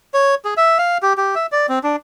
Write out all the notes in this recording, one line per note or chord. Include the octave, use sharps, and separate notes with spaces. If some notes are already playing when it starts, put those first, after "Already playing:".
C#5
G#4
E5
F5
G4
G4
E5
D5
C4
D4